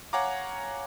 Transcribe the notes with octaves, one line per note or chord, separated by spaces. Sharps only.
C#5 F5 F#5 G#5 A#5 D6